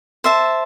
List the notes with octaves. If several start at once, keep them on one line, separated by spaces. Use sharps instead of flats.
C5 E5 A5